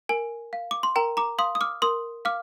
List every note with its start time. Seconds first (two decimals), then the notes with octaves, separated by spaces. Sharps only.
0.09 A#4 G#5
0.53 F5
0.71 D6
0.83 C6
0.96 A#4 G5 A#5
1.17 A#5 D6
1.39 F5 C6 D#6
1.55 D#6
1.61 D6 F6
1.82 A#4 C6 D#6
2.25 F5 D6 F6